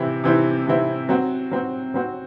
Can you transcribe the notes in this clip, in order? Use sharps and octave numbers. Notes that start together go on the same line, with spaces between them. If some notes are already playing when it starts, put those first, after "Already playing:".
Already playing: C3 E3 C4 E4
C3 E3 C4 E4
C3 E3 C4 E4
F#3 C4 F#4
F#3 C4 F#4
F#3 C4 F#4